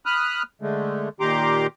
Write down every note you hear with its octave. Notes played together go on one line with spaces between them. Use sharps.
B5 D#6 F6 F#6
D3 G#3 A3
A#2 D#3 G4 A#5 C6 D6